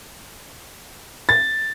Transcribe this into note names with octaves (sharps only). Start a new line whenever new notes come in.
A6